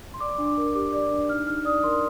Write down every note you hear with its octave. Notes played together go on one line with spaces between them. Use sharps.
C6
D5 D6
D4
A#4
G4 D6
D5
D4
D#4 F6
D#4 F6
D5 D#6
A#4 C6